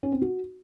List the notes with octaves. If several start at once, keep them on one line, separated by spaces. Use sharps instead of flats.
C#4
C4
F#4